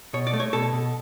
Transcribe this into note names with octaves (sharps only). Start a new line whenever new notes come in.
B2 C#5
D5
A3
C#5
B2 A4
B2